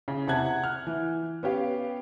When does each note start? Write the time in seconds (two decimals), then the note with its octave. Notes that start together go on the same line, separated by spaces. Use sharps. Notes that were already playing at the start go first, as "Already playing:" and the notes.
0.08 C#3
0.27 E2 C3 F#5 A5 F#6 G#6
0.45 F#5
0.64 F6
0.87 E3
1.43 B3 C#4 G4 F5